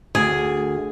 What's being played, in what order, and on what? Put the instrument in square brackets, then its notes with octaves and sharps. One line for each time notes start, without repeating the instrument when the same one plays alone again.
[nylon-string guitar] D2 [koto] G#4